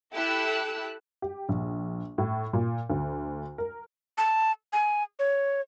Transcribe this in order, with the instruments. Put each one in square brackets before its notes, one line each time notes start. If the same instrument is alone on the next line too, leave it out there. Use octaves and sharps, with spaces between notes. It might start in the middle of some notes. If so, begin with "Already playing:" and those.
[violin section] E4 G4 A4 E6 F#6
[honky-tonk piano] G4
A#1
A2
A#2
D2
A#4
[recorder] A5
G#5
C#5